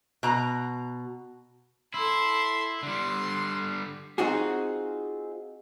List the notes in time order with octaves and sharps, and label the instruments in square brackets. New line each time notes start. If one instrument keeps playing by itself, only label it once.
[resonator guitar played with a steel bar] B2 A#5
[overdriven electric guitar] E4 [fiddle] A4 C6
[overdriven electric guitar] D3 G3 [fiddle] C6
[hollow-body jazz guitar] C4 D#4 F4 F#4 G#4